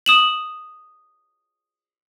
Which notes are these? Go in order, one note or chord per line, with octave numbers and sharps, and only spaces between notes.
D#6 E7 F#7